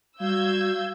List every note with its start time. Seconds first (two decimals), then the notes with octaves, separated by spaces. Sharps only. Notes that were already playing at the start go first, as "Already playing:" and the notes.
0.20 G3 F#4 F5 E6 G6 G#6